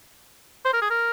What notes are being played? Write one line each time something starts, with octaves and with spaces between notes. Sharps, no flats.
C5
A#4
G#4
A#4